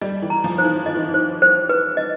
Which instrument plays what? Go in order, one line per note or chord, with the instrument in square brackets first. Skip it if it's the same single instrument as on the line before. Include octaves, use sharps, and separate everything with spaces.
[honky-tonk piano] G3 [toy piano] D#5
[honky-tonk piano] E3
[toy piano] A#5
[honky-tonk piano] F3
[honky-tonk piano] D#3 [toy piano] C5
[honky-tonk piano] E3
[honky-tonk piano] D#3 [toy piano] D#5
[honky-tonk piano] E3
D#3
[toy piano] C5
C5
B4
D#5